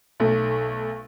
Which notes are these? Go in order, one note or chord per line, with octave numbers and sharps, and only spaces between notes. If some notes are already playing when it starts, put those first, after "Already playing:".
B1 A3